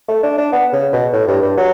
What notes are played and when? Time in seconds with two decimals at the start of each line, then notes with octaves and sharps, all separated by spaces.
0.08 A3
0.23 D4
0.38 D4
0.53 B3
0.73 C#3
0.93 B2
1.13 A2
1.27 G2
1.43 G2
1.58 F#3